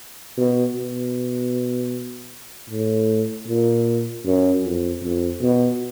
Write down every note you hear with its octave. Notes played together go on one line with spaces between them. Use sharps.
B2
B2
A2
A#2
F#2
F2
F2
B2